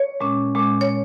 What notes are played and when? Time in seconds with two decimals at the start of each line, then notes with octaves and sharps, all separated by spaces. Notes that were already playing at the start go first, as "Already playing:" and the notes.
Already playing: C#5
0.20 A#2 G#3 C#4
0.55 A#2 G#3 C#4
0.81 C#5